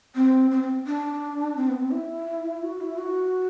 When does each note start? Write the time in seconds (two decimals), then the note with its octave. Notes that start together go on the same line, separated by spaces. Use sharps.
0.16 C4
0.51 C4
0.63 C4
0.86 D4
1.57 C4
1.69 B3
1.80 C4
1.92 E4
2.63 F#4
2.80 E4
2.98 F#4